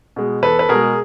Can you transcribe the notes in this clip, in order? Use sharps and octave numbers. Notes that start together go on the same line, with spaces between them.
B2 G#3
E2 A4 B4
B4
B2 G#3 G#4 A#4